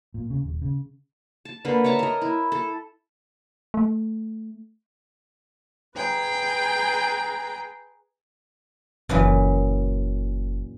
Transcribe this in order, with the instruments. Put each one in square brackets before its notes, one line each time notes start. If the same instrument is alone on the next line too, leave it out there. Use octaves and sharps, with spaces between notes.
[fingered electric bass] A#2
C#3
D#1
C#3
[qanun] A5
D3 A#3 B4
C#5 E5 A5 A#5
A#4 D#5
E4
A4
[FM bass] A3
[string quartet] G#4 B4 G5 A#5
[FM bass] F#1 [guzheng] F#2 A#2 E3